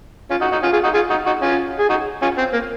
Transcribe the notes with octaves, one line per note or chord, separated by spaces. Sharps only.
C#4 F4
D#4 F#4
D#4 F#4
C#4 F4
F4 G#4
D#4 F#4
F4 G#4
D#4 F#4
D#4 F#4
C#4 F4
G#4
D#4 F#4
C#4 F4
C4
A#3